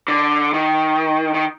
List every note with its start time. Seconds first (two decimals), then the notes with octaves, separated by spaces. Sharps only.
0.08 D3
0.54 D#3
1.34 D#3